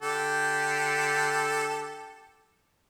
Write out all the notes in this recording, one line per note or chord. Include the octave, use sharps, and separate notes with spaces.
D3 G4 A4